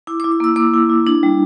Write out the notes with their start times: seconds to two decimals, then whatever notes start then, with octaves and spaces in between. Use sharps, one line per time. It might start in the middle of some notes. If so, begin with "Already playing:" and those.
0.07 E4 D6
0.20 D6
0.24 E4
0.32 D6
0.40 A#3 E6
0.56 A#3 D6
0.74 E4
0.89 E4
1.07 D4
1.23 G3